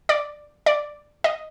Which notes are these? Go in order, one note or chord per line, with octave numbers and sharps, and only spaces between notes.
D5
D5
D#5